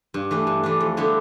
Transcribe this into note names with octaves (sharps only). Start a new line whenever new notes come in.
G2
E3 A3 D4
G2
E3 A3 D4
F2
D3 G3 B3 E4